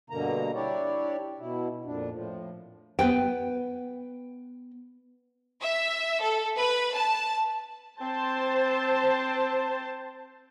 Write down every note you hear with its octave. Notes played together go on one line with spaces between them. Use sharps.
G2 B2 D3 A#3 A#5
D4 E4 G4 C#5 D5
B2 E4
F2 A#2 D4
A2 F3
B3 B4 G5
E5
A4
B4
A5
C4 C5 A5